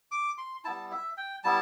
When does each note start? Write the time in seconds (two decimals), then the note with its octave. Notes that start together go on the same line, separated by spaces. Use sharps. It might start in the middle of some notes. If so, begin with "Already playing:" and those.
0.11 D6
0.38 C6
0.65 G3 B3 E4 A5
0.91 E5
1.17 G5
1.44 G3 B3 E4 A5